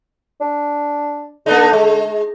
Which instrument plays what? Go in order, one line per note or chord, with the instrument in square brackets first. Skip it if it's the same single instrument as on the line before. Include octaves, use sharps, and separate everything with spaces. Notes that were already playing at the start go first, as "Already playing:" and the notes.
[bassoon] D4
[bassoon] D3 [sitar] A#3 D4 D#4
[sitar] G#3